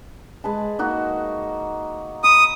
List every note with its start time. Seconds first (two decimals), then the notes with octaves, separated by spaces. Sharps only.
0.44 G#3 B4 A5
0.79 A#3 D#4 F#4
2.24 B5 D#6